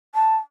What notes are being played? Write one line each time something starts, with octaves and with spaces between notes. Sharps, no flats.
A5